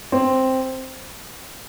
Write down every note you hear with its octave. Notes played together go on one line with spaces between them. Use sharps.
C4